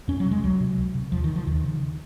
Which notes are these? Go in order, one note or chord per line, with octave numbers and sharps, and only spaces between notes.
F2 C#4
F#3
C3
G#3
C#2 F#3
C3
C#2
C3
D#2 F3
D#3
C#3
F3
D#2 D#3
C#3